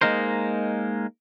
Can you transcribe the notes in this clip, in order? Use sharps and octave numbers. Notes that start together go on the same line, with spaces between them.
G#3 A#3 D#4 A#4 C5